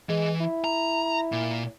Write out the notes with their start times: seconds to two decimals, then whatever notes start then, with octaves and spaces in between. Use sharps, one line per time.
0.09 E3 G#3
0.41 E4
0.64 A#5
1.32 A#2